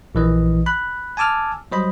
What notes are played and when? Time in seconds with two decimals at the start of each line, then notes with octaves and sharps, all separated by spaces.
0.15 A#1 E3 D#5
0.66 B5 F#6
1.17 G#5 A5 D6 E6 F6
1.72 F#3 G3 C5 D#5 B5